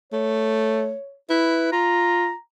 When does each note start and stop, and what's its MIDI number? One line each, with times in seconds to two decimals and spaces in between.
0.13 0.94 57
0.13 1.15 73
1.30 1.69 64
1.30 1.71 71
1.72 2.32 65
1.72 2.36 82